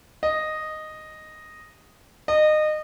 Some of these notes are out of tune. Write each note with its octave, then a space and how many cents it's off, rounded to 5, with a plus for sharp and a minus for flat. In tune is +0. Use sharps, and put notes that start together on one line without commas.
D#5 -5
D#5 -25